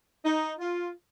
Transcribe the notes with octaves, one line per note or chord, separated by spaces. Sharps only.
D#4
F4